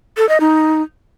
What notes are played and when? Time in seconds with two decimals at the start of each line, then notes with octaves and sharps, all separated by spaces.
0.17 A4
0.29 D#5
0.40 D#4